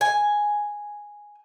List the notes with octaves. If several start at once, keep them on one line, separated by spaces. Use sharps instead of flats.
G#5